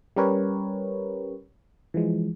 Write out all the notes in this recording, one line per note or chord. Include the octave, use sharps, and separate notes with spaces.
G3 C#4 G4 A#4 B4 C#5
E3 F3 G#3